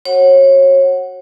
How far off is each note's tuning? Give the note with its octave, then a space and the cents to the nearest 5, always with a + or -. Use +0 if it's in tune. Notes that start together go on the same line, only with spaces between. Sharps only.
F#4 +0 C#5 -30 F#5 +0